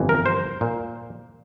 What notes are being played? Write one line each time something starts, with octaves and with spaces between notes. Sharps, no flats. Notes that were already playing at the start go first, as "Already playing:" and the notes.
Already playing: G1 F2 E3
A#4
C5
A#2